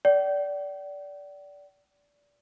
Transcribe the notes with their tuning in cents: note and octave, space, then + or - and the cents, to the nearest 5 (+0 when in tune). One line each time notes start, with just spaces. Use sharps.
D5 -20 G5 -45